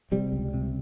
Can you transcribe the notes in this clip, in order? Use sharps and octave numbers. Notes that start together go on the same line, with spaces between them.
C3 G3
C#2
C3